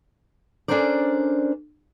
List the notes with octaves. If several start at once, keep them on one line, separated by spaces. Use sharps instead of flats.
C#4 D4 A4 A#4 C5 D5